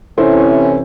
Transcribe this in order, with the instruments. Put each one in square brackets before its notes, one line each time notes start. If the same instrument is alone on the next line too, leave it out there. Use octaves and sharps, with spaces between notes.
[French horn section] C3 E3 C#4 [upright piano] E4 A4 C5